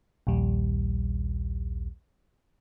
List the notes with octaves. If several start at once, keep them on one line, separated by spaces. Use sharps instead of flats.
A#1 D#2 G3